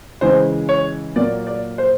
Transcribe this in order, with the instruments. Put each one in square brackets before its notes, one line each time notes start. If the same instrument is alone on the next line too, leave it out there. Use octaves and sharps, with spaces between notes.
[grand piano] C#3 E3 G#3 C5
C#5
A#2 F#3 A#3 D5
D5
C5